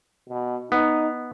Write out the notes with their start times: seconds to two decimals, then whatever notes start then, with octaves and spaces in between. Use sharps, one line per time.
0.29 B2
0.72 B3 D#4